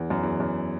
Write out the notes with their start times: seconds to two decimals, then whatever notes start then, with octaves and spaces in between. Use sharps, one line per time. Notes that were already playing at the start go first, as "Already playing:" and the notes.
Already playing: E2
0.10 F#2
0.23 E2
0.40 F#2